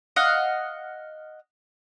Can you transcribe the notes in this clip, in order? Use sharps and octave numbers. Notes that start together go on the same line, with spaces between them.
D#5 F5 F#5